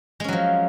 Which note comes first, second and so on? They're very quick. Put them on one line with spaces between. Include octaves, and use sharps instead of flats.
G#3 C#4 F#3 F3